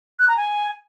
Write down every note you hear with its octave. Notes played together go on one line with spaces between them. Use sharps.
F#6
A#5
G#5